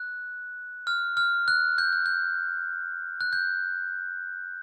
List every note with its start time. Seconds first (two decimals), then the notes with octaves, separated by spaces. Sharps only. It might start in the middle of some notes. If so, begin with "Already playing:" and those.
Already playing: F#6
0.87 F6
1.17 F6
1.48 F#6
1.78 G6
1.93 F#6
2.06 G6
3.21 F#6
3.33 G6